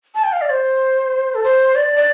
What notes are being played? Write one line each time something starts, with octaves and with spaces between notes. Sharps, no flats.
A5
G5
F5
D5
C5
A4
C5
D5
D5